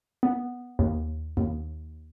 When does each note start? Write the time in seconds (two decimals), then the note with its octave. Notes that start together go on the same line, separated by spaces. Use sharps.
0.23 B3
0.79 D#2
1.37 D#2